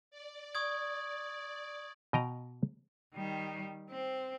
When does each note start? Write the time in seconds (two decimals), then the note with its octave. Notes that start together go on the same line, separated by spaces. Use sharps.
0.11 D5
0.55 C#6 D#6 G#6
2.13 B2 D#5 G5 A#5
3.15 D#3 G3
3.90 C4